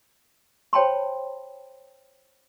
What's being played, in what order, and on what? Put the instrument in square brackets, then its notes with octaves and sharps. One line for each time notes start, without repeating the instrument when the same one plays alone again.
[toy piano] C5 C#5 G5 A5 B5 C6